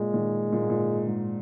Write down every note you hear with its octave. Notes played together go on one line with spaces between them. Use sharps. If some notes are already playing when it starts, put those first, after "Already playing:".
Already playing: A#2 G#3
A#2 D#3
A#2
G#2
A#2
G#2